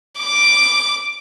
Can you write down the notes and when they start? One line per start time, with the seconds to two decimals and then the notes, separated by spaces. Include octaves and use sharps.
0.19 D6